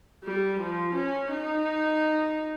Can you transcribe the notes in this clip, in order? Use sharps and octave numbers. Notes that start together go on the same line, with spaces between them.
G3
F3
C#4
D#4